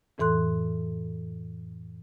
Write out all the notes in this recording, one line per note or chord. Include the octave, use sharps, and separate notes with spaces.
F2 A2 E3 A4 C6 F#6